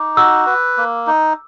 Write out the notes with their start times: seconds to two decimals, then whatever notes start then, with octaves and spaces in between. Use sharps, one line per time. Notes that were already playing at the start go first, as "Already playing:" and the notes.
Already playing: D#4 D6
0.16 F#4 E6
0.47 B4
0.77 A#3
1.07 D#4